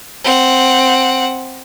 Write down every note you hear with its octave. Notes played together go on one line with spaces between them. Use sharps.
C4 F#5